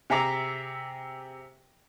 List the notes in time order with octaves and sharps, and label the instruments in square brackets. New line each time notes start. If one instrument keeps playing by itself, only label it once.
[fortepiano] C3 G#4 E5 A#5 D6